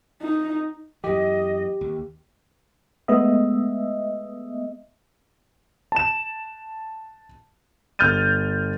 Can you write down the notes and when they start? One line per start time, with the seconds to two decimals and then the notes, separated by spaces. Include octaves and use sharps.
0.22 D#4
1.04 F#2 E3 G4 D#5
1.81 D#2
3.08 G#3 A3 B3 D#5 E5
5.92 A5 E7
7.99 G1 F6 G6 A6 D#7